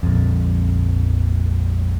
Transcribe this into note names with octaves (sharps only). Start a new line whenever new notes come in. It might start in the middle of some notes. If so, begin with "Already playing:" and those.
A#1 F2